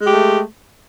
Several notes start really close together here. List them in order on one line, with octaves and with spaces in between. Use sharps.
G#3 G4 A3